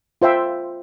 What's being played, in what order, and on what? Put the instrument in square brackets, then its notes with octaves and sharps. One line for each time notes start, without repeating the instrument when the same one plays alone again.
[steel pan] F4 C5 E5 G5